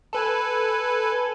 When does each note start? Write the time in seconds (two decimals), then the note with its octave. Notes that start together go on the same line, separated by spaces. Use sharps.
0.13 A4 B4 G#5